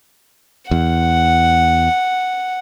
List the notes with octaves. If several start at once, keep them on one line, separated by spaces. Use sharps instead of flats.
E2 F#5